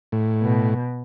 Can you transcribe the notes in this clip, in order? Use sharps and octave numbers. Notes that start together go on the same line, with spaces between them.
A2
B2